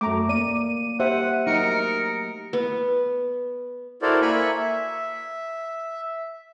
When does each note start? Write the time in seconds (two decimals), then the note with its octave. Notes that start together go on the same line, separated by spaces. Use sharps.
0.01 F#2 A3 A#5 D6
0.29 A#3 D5 D#7
1.00 G4 C5 E5 F#5
1.47 F#3 A3 D#4 A#4 C#7
2.53 B3
4.02 E4 F#4 A4 A#4 C5 D5
4.21 A#3 E5 G#5 B5 C#6
4.56 E5